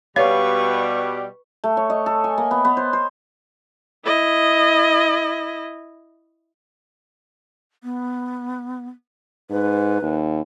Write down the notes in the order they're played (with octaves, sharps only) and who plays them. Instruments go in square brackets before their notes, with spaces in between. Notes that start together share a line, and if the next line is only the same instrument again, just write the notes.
[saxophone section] B2 G3 [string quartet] B4 C#6 [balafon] C#5 [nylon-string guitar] F5
[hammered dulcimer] A3
C#5
D#5
A4
G#5
A#3
B3
B3
C5
C5
[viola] E4 D#5
[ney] B3
[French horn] G#2 [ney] B4
[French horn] D#2